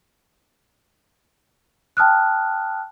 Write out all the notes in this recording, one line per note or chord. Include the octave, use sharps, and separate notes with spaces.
G5 A5 D#6 F6 F#6